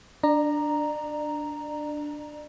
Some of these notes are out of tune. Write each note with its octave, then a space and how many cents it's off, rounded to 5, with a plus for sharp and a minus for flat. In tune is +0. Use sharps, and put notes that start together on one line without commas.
D4 +0 D5 +35 A#5 +0